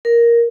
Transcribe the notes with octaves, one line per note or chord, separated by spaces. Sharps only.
A#4